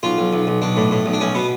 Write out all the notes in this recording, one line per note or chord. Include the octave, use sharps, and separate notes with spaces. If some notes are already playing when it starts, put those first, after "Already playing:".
B1 F4
B1
B1
B1
B1 D4
A2
A2
B1
D4
B1 C#4
B2 B3